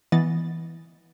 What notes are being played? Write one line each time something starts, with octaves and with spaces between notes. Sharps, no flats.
E3 B3 D#5 A6